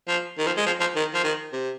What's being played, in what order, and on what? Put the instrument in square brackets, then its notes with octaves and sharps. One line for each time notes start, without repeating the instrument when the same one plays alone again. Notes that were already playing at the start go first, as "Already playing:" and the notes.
[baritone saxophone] F3
D#3
F3
G#3
F3
F3
D#3
F3
D#3
C3